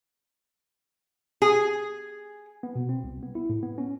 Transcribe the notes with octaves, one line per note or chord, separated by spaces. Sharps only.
G#4
B3
B2
C4
C2
B3
E4
A2
B3
C#4